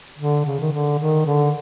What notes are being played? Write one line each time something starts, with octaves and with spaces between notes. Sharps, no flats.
D3
C#3
D#3
D3
D#3
D3